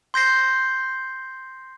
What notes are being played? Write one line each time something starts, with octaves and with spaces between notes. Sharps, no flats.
C6 G6 A#6 C7